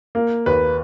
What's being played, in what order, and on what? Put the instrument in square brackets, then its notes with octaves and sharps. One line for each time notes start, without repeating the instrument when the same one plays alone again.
[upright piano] A#3
[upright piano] D#2 [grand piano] B4